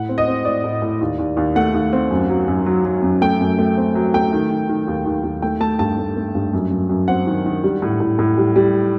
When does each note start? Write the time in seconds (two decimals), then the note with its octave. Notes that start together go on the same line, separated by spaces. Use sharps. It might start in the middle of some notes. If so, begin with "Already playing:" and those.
Already playing: A2 F#5
0.09 C4
0.18 D#5
0.27 C4
0.45 A2 D5
0.64 A2
0.82 A2
1.01 D#2
1.19 D#2
1.37 D#2
1.56 A3 F#5
1.74 D#2
1.93 C4
2.11 F#2
2.29 F#3
2.48 F#2
2.66 F#3
2.85 F#3
3.03 F#2
3.21 A3 G5
3.41 F#2
3.59 A3
3.77 C4
3.95 F#3
4.14 A3 G5
4.33 D#3
4.51 D#3
4.69 D#3
4.87 D#2
5.06 D#2
5.24 D#2
5.42 A3 G5
5.60 A3 A5
5.79 G2 A5
5.98 A3
6.17 A3
6.35 G2
6.53 F#2
6.71 F#2
6.89 F#2
7.08 C4 F#5
7.27 D#3
7.46 D#3
7.64 G3
7.82 A2
8.00 A2
8.19 A2
8.38 G3
8.56 G3